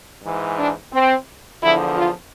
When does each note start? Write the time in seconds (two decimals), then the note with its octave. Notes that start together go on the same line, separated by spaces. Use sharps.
0.23 G#2 E3
0.57 D4
0.92 C4
1.62 E2 D3 F3 E4
1.96 F4